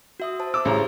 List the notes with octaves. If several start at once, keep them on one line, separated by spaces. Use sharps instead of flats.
F#4 E5 D#6
C5 A5
D6 E6
A1 C#3 G4 C5 A#5